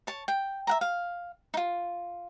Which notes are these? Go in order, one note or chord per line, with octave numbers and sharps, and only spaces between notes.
C#5 A5
G5
E5 F#5 A#5
F5
D#4 F4